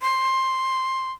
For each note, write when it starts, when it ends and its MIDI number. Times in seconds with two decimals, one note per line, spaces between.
0.02 1.12 84